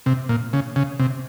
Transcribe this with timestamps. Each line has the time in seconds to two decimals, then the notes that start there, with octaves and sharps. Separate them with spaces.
0.06 C3
0.29 A#2
0.53 C#3
0.76 C#3
0.99 C3